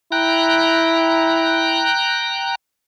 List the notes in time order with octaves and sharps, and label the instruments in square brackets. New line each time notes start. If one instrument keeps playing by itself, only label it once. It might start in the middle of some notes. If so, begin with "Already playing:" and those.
[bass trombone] E4 [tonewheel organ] G5 A#5 F#6